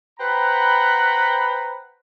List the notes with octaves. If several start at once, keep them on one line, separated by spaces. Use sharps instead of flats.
B4 C5 F#5 G5 A#5 B5